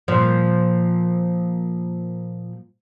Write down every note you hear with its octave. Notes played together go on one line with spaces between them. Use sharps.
A#2 F3